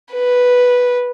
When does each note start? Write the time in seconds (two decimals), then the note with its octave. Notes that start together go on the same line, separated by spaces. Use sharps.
0.13 B4